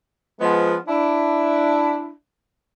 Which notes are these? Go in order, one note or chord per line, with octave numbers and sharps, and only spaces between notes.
F3 G#3 B3
D4 E4